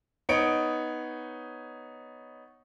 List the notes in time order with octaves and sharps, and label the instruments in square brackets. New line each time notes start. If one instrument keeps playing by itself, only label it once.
[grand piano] B3 D#4 C#5 C#7 D7